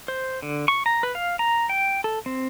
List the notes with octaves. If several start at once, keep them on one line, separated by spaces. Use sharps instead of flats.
C5
D3
C#6
A#5
B4
F5
A#5
G5
A4
C4